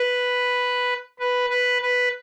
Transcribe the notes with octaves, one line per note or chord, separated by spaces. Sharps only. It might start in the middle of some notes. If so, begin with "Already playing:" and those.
Already playing: B4
B4
B4
B4